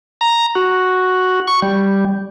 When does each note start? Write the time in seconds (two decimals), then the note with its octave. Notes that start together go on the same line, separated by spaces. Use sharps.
0.21 A#5
0.55 F#4
1.47 C#6
1.62 G3